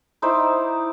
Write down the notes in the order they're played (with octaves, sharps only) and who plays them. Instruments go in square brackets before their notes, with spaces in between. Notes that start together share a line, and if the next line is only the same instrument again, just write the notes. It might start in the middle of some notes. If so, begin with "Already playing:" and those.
[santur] D#4 E4 C5 D5